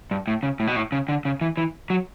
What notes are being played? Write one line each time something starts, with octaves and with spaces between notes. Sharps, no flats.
G2
A2
C#3
A2
B2
A2
C#3
D3
C#3
E3
E3
F#3